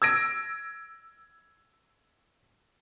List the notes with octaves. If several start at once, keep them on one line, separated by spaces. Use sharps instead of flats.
E6 G#6 A#6 D7